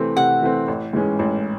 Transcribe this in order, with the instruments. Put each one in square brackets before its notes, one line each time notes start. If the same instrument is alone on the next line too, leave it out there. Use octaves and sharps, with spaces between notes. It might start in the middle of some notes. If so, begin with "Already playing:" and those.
Already playing: [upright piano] C3 E3 A3 C4
[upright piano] C3 [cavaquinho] F#5
[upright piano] E3 A3 C4
A1
G#2 E3 G#3 C#4
A1